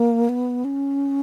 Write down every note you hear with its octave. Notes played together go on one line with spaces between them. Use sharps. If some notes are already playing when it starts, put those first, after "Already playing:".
Already playing: A#3
B3
C#4